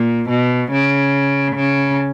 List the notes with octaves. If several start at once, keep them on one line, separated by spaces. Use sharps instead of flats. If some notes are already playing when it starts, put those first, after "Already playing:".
Already playing: A#2
B2
C#3
C#3